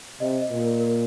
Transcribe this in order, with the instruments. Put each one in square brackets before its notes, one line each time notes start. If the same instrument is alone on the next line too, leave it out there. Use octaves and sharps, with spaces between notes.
[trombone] C3 [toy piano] D#5
[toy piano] D#5
[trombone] A#2
[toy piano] A#4
A#4